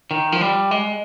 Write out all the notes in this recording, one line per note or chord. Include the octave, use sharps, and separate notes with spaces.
D#3
F3
G3
G#3